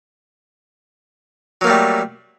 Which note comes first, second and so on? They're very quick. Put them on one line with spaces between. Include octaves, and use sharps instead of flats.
F#3 A#3 A3 G3